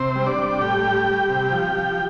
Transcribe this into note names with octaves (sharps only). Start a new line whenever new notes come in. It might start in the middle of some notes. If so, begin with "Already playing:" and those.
Already playing: C3 C4 C5
G3
D4 D5
G3
A2 G4 G5
G3
G3
C3
F3
F3